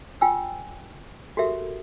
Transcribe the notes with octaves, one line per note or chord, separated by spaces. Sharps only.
F4 G5 G#5 E6
F#4 G4 A4 A#4 E5